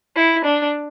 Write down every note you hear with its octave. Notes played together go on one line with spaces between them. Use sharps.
E4
D4